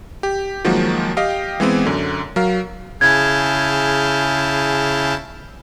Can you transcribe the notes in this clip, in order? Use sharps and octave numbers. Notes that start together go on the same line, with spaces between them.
G4
D#3 F3 F#3 G#3 A#3 F#4
G4 D#5 F5 G5
E3 G#3 B3 C4
F#2 D3
F#3 A#4 F5
C#3 E4 G#4 A5 F6 G6 G#6